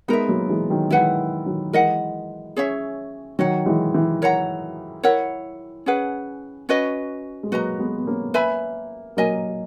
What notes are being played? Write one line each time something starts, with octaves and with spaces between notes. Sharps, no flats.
G#3 B3 D#4 A#4 E5
F#3 A#3
E3 G#3
D#3 F#3
E3 G#3 E4 B4 F#5
D#3 F#3
E3 G#3 A#4 D#5 F#5
C#4 G#4 C#5 E5
D#3 F#3 F#4 C#5 F#5
E3 G#3
E3
A#4 C#5 F#5 A#5
E4 A#4 C#5 F#5
C#4 G#4 B4 F#5
C#4 F#4 B4 D#5
G#3
F#3 A#3 F#4 B4 D#5 A#5
G#3 B3
B3
A#3 C#4
B4 E5 G#5 B5
F#3 A#3 A#4 D#5 G#5